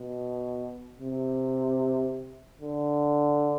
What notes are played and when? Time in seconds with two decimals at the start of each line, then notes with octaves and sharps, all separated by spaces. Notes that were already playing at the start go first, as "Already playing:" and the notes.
Already playing: B2
1.00 C3
2.61 D3